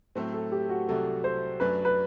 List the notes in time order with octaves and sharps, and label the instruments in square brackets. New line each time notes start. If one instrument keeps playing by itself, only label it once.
[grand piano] A2 F#3 A3 C4 [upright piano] C5
[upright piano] A4
G4
F#4
[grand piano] C2 C3 F#3 A3 [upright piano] A4
[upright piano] C5
[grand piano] F#2 F#3 A3 D4 [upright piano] B4
[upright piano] B4